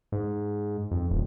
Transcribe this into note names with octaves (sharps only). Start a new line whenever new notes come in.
G#2
F2
D#1